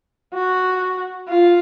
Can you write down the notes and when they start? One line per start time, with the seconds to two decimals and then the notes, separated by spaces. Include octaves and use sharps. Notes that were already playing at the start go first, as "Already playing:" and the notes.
0.34 F#4
1.29 F4